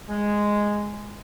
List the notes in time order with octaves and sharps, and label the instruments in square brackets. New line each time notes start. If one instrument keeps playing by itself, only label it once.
[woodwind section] G#3